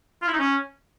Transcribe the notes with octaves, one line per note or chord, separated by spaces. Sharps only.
F4
E4
D#4
C#4